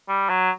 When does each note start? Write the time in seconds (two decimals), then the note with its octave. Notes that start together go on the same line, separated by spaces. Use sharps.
0.08 G3
0.29 F#3